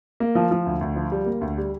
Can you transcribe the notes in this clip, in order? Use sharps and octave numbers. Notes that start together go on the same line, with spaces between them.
A#3
F3
F3
D2
D2
F3
G3
A#3
D2
G3